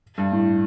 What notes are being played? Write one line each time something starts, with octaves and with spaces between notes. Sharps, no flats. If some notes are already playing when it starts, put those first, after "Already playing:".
G2
A2